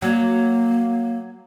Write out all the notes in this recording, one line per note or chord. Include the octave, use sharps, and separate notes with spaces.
F#3 A#3